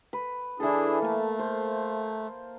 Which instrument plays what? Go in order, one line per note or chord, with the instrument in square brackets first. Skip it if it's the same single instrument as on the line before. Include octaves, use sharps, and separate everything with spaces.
[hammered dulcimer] B4
[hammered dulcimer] E3 A4 [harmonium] D4 E4 G#4
[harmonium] A3 [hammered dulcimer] A#3 A5
[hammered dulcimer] C5